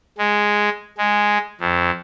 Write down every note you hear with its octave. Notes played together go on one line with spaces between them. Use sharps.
G#3
G#3
F2